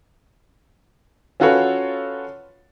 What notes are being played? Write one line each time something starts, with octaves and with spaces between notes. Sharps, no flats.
C#4 F4 F#4 A4 B4 C#5